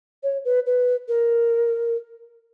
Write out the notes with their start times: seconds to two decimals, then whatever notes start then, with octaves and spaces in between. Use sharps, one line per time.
0.23 C#5
0.45 B4
0.66 B4
1.08 A#4